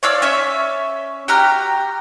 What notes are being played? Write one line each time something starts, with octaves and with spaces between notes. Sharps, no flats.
C#5 D5 F5 E6
C#4 C#5 E5
F#4 G4 A#5 F6